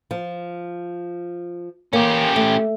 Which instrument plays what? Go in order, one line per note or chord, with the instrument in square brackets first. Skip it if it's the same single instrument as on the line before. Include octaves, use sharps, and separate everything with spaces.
[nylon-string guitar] F3
[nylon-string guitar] A#3 [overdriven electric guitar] C#4 G4
[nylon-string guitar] A3